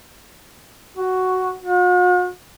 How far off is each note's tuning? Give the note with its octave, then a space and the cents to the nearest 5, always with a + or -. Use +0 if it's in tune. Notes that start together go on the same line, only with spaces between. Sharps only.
F#4 +5
F#4 -45